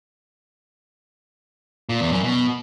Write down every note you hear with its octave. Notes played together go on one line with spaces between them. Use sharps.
A#2
E2
F#2
B2